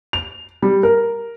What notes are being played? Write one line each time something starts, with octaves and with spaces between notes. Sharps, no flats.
F7
G3
A#4